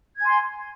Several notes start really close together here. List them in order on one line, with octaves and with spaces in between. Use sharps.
G#6 G#5 C6